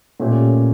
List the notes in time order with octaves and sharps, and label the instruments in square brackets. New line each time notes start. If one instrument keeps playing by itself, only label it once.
[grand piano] A#2 A3 C#4 G4